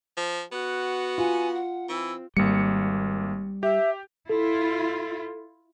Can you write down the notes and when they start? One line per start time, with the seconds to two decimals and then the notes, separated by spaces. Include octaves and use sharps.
0.17 F3
0.52 B3 F#4 F#6
1.18 F4 G#5
1.54 F#5
1.89 E3 C4 E6
2.37 G#1 G3 A#3 C#7
3.63 G4 E5
4.29 E4 F4 A4